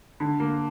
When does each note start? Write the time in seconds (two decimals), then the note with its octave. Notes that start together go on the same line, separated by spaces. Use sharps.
0.20 D3
0.40 A#3